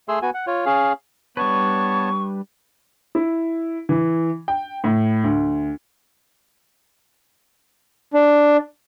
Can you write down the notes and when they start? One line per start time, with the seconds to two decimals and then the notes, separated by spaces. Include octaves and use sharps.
0.09 A3 G#4 C6 E6
0.22 B3 F#4 G#5
0.34 F#5
0.47 F4 C#5
0.66 C#4 G#4 F5
1.37 G3 B3 D4 B4 C#5 A5 C#6
3.15 E4
3.89 E3
4.48 G5
4.84 A2
5.24 D2
8.13 D4